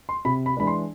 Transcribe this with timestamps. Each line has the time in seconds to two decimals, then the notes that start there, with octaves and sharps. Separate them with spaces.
0.09 C6
0.25 C3 B5
0.46 B5
0.57 E3 G#3 D4 B5
0.67 C6